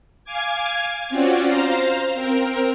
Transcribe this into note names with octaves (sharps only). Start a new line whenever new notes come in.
F5 G#5 D6 G#6
C4 C#4 F4 F#4 D5
C5 F5 A#5 F6
C4 A#4